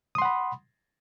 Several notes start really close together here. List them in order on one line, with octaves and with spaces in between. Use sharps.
D#6 C6 F#5 B5